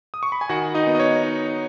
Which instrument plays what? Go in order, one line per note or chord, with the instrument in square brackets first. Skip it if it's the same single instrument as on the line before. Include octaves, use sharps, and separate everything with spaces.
[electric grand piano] D#6
C#6
B5
G#5
D#3 F#4 F#5
D#4 D#5
B3
D#5
C#5
D#4